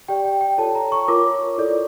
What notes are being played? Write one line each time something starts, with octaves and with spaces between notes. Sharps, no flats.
G4 D5 G5
G5
G5
F4 A4 C#5 A5
A#5
C#6
F4 A#4 C#5 D6
E4 A4 D5